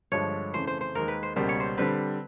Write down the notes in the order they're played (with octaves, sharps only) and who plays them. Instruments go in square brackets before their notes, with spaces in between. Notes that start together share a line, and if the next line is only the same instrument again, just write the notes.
[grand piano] G2 D3 F3 G#3 [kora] C#5
[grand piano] F2 C#3 E3 A3 [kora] C5
[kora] C5
C5
[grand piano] D#2 D#3 G#3 [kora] A#4
[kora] B4
C5
[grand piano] C#2 B2 G3 A#3 [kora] C5
[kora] C#5
C5
[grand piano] D3 G3 C4 [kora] B4